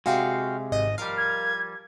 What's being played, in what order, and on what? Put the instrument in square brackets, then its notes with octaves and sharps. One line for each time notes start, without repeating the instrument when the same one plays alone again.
[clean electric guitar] C3 G#3 [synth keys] F#4 F5 G5
[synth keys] G#1 D#5 D#7
[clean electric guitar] F3 G3 [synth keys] A#4 F5
[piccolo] G#6